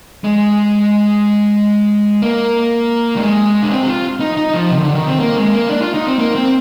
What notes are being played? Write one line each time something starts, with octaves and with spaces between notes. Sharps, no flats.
G#3
A#3
G3
G#3
D4
C4
G4
F4
D#4
D#4
F3
C3
D#3
D3
D#3
C4
A#3
G#3
A#3
D4
F4
D#4
C4
A#3
C4